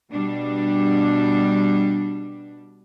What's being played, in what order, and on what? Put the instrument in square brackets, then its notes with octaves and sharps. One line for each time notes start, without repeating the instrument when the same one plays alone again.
[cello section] B2 G3 D4